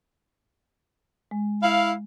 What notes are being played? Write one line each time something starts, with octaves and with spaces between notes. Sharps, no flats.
G#3
E4 F5